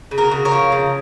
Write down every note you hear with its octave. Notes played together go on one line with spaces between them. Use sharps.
C#3
F#4 A#4
C#3
A#4 C#5
F3
C#3